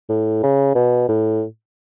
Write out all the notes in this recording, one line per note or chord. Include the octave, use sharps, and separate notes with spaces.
A2
C#3
B2
A2